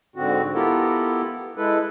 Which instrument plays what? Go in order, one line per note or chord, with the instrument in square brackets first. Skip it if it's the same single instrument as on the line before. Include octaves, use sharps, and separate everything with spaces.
[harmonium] G#2 D3 C4 F#4
B3 E4 F4 G4 A4 A#4
G#3 E4 A4 B4